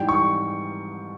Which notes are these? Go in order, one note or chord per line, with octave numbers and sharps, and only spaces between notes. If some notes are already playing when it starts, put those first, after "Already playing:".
Already playing: G#2 E3 G3 G5
C#6